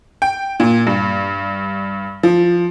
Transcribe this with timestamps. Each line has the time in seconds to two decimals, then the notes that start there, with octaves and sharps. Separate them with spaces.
0.22 G5
0.60 A#2
0.87 G2
2.23 F3